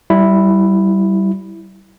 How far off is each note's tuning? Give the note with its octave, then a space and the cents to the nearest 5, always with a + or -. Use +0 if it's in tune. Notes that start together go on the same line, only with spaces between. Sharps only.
G3 -25 E4 +0